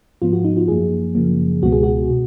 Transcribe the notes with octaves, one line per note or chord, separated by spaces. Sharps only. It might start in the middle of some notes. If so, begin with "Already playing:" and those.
G#2 F3 B3 F4
F#4
D#4
F4
F#2 F3 A#3 G#4
F#2 C#3 F3 A#3
C#2 B2 G#3 B3 F#4
G#4
F#4
B2